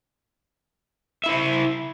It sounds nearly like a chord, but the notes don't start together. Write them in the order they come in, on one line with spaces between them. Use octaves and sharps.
E5 E4 C5